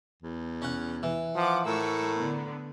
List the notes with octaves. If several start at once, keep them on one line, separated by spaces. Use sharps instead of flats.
E2
C#4 F#5
E3
F3 F#5 D6
A2 A3 A#4 C#6 E6
D3 B3